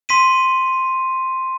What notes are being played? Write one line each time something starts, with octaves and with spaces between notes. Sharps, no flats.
C6 B6 D#7